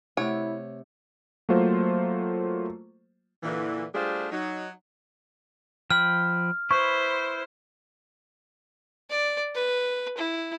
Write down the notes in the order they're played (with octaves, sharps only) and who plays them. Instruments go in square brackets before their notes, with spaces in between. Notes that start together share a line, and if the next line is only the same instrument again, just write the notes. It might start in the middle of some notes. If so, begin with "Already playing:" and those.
[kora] C3 [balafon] A3 F#5 [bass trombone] E4 [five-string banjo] C#5
[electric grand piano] F#3 A3 A#3 F4 C5
[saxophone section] A#2 D3 E3
G3 A3 D4 F4 G#4 C5
F#3 D#4
[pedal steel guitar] F3 G5 B5 [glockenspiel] F6
[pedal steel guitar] E4 B4 [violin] C5 [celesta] C#6
[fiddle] D5
B4
E4